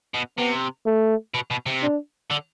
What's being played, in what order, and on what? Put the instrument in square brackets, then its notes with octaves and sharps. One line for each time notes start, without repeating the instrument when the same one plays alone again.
[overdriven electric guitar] B2
[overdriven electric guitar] C3 [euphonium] B3
[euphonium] A3
[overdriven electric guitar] B2
B2
C3
[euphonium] D4
[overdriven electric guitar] D3